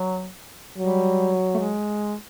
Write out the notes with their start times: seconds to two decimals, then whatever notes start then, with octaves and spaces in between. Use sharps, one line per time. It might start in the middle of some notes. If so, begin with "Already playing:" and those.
Already playing: F#3
0.78 F#3 G3
1.54 A3
1.58 G#3